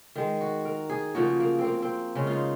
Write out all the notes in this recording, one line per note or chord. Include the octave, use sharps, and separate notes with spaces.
D#3 G#3
F#4
A#4
G#4
C#3 F3 A#3 F#4
A#3
C4
A#3
C4
C#3 G#3 C#4
D#4 F4